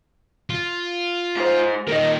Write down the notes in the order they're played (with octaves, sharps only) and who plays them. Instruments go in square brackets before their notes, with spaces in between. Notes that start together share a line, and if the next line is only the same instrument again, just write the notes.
[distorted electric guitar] F4
[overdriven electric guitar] G#2 C5
[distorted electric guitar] A#2 D#3 [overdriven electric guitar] A#4 D#5